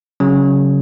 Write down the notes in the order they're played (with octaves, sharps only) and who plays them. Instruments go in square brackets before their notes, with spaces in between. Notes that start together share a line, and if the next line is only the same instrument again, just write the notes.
[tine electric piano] C#3 F#3 C#4